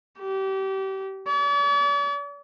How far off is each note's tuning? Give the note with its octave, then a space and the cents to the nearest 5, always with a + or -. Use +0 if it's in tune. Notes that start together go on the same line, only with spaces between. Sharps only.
G4 -30
D5 -45